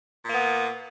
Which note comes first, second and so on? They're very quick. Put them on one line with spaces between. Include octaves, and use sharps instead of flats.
A#2 A#3 B3